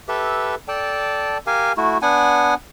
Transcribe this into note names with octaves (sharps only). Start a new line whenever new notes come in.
G4 A4 B4 E5
A4 D5 G5 A5
G4 A#4 F5 G#5
A3 E4 F#4
B3 D4 F#5 G#5